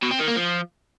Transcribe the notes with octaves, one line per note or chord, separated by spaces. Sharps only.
B2
C4
D#3
A#3
F3